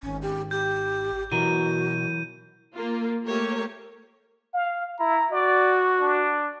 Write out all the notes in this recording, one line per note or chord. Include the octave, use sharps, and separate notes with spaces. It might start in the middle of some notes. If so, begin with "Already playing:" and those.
G#1 C#4
G4
G4 G6
B2 E3 F#3 F#4 A#4 D#7
A#3 F4
A3 A#3 G4 C#5
F5
E4 A#5
F#4 D5
D4